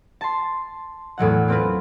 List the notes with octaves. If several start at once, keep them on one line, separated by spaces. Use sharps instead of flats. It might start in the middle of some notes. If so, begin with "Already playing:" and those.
A5 C6
E2 A2 F#3 F#5
A#3 C4 F4 B4